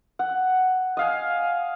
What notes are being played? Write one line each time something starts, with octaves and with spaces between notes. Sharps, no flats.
F#5
D#5 F5 G#5